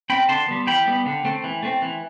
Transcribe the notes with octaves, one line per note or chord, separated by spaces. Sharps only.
C4 G5 B5
D3 A5 C6
G3 B3
E3 G5 B5
G3 B3
D3
A3 C4
E3
A3 C4
E3